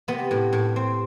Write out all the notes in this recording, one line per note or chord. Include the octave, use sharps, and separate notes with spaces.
C3 B3
A2
A2
C4